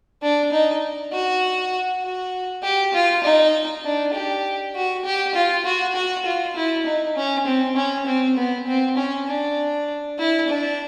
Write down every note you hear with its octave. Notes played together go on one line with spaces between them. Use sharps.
D4
D#4
F#4
F#4
G4
F4
D#4
D4
G4
F#4
G4
F4
F#4
F#4
F4
E4
D#4
C#4
C4
C#4
C4
B3
C4
C#4
D4
E4
D4